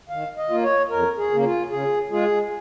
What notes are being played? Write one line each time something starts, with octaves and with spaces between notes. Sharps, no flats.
D#3 F5
D#5
A#3 F4
C#5
F2 A#4
G#4
C#3 A#3
F4
C#3 G#4
G#3 F4 G#4